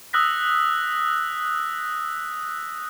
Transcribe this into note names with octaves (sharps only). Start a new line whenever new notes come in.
D#6 E6 F#6 A#6 B6